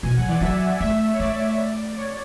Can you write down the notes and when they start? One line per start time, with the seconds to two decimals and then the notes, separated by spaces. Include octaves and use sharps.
0.03 B2 G#5
0.16 F#3 F#5
0.28 E3 D5
0.41 F#3 E5
0.80 A3 E5
1.13 C#5
1.19 A3 D5
1.96 C#5